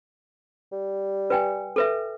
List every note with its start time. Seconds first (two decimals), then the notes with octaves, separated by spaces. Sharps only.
0.72 G3
1.30 B4 G5 G#5
1.76 A4 B4 E5